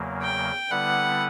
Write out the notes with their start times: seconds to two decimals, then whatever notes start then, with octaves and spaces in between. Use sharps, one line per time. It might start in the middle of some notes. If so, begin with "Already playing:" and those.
Already playing: E2 C#3 F#3 A#3
0.22 G5
0.70 D3 G3 B3 E4 B4 F#5